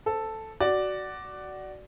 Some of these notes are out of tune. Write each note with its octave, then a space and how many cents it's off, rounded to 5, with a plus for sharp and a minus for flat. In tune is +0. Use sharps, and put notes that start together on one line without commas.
A4 +0 C5 -20
F#4 +15 D5 +0